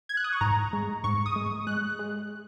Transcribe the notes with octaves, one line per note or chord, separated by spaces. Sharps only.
G#6
F#6
D#6
C#6
G#2 A#5
G#3
G#2 C#6
D#6
G#3
G#3 F#6
G#3